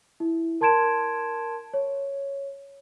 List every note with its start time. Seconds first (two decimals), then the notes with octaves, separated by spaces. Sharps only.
0.20 E4
0.61 A#4 A5 C6 G#6 D7 E7
1.74 C#5